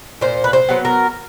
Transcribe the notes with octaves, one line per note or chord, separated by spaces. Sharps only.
A#2 C5
B4
C5
F#3 B3
A#4